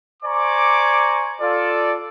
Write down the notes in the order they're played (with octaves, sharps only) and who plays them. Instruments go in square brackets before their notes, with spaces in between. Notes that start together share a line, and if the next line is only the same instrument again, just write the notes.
[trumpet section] C5 D5 G#5 A#5 C#6 D6
F4 A4 D5